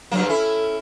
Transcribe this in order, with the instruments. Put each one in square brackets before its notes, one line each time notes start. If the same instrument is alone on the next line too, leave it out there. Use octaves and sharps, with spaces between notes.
[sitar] G2 C#3 A#3 [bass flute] F#3
[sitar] C#4 E4 [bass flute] A4